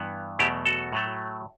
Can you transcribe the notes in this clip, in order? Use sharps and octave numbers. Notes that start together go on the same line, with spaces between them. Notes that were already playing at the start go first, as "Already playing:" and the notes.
Already playing: G2 E3 B3
E2 B2 F#3 A3 E4 G4
F#4 A4
A2 F#3 A3